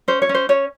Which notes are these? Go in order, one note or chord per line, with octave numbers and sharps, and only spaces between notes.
C#4 C5
C#5
C#4
C5
C#4 C#5